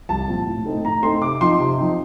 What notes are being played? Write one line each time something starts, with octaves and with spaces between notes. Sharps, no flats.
C2 A5
A#2 F3 C4
A2
A3 C4 D#4
A2 A#5
A3 C4 D#4 C6
C3 D6
F3 C4 D#4 C6
C3
F3 C4 D#4